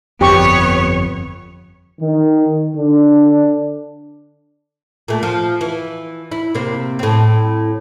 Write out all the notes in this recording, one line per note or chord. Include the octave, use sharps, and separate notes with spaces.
G1 F2 B3 G4 C#5 C#6
D#3
D3 D4
A#2 A3
F3
E3
E4
C3 A#3 C4
A2 C4